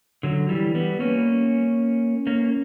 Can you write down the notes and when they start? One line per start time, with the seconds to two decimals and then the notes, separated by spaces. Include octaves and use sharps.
0.23 D3 F#3
0.49 E3 G3
0.75 G3 B3
1.00 A#3 C#4
2.27 A#3 C#4